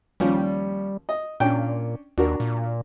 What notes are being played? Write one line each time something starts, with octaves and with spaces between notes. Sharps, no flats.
D#2 F3 G3 C#4
D#5
A#2 C#4 D4 G5
D#2 D4 F#4 A#4
A#2